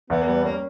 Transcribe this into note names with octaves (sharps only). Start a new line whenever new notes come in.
E2 B3
A#3
G3 B3
A#3 C#4